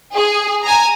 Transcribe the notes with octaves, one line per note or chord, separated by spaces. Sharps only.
G#4
G#5 A#5